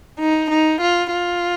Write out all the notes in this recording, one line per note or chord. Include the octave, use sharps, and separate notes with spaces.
D#4
D#4
F4
F4